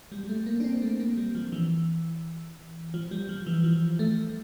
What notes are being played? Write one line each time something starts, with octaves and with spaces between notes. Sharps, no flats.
G3
G3
A3
A#3
D4
C4
A3
A#3
G3
F3
E3
F3
G3
F3
E3
F3
A3